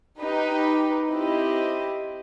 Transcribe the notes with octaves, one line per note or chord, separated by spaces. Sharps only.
D#4 G4 B4
C4 E4 G4 D#5